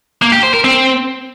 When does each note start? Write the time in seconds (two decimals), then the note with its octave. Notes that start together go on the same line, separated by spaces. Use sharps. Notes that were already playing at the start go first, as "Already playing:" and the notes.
0.22 A#3
0.32 G4
0.43 C5
0.54 A#4
0.64 C4